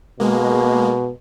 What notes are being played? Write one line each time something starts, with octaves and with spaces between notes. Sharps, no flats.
B2 G#3 A#3